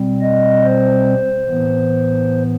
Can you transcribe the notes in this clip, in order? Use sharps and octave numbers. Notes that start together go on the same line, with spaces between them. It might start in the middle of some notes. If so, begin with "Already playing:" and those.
Already playing: B2 G3 C4
D#5
C5
A2 E3 B3